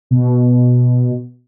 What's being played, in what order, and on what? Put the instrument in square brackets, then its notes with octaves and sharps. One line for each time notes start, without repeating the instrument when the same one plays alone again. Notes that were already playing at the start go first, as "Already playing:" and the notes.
[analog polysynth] B2